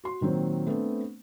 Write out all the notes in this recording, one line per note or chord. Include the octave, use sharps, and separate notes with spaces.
F#4 C6
A#2 D#3 F#3 C4
A3 B3 C4 D4 C5